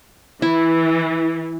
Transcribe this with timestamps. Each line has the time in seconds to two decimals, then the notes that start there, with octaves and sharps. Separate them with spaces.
0.42 E3 E4